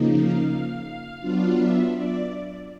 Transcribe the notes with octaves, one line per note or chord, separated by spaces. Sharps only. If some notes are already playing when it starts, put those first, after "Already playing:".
Already playing: C#3 F3 A#3 D#4
F5
F#3 B3 D4 F4
E5
D5